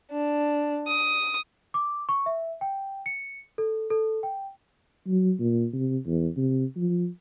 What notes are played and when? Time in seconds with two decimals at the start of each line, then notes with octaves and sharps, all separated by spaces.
0.11 D4
0.88 D#6
1.74 D6
2.09 C#6
2.26 E5
2.61 G5
3.06 C#7
3.58 A4
3.90 A4
4.23 G5
5.07 F#3
5.39 A#2
5.73 C3
6.06 E2
6.36 C3
6.76 F3